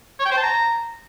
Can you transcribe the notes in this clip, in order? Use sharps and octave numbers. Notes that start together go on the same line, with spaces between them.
C#5
G5
C5
A5
A#5